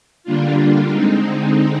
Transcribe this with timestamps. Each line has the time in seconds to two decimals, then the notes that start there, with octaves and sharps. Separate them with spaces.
0.24 D3 G3 A#3 D4 F4
0.90 D3 G#3 C4 D#4